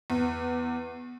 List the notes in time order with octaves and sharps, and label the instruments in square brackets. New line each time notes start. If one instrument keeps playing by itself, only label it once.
[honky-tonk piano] E2